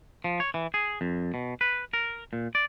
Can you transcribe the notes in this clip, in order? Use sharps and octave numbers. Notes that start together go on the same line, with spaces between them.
F3
C#5
E3
G#4
F2
B2
B4
A#4
A#2
D5